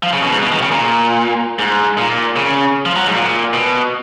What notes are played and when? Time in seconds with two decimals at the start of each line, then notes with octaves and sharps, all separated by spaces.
0.03 F3
0.13 C#3
0.22 B2
0.32 G#2
0.42 B2
0.52 D#3
0.57 B2
0.62 C#3
0.71 A#2
1.59 G#2
1.98 A#2
2.37 C#3
2.86 F3
2.96 F#3
3.08 G#2
3.14 A#2
3.53 B2